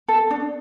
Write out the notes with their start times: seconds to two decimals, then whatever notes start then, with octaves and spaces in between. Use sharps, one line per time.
0.08 A4
0.31 D4